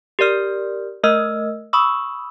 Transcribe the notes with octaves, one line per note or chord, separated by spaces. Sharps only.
G4 A#4 D5 F6
A3 A#4 D#5 E6 F6
B5 C#6 D#6 E6